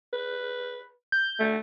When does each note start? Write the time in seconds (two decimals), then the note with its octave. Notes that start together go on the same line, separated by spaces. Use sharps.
0.13 B4
1.12 G6
1.40 A3